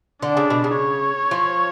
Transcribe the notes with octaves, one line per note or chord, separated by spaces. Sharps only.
D3 D4
C#3
B2
C#3
C#5
F3